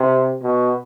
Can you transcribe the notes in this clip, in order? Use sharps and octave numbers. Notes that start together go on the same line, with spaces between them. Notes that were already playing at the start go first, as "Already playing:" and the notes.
Already playing: C3
B2